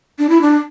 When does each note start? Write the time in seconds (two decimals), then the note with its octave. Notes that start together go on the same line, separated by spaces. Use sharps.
0.19 D4
0.29 E4
0.41 D4